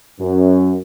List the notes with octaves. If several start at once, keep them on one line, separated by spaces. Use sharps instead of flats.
F#2